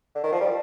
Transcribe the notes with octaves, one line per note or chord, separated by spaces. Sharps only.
D3
D#3
F3
G3